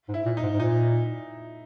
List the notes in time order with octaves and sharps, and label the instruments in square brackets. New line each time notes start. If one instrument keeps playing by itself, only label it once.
[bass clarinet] G#2
[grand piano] E4
[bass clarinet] A#2
[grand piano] D#4
[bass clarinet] G#2
G#2
[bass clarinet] A#2 [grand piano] D#4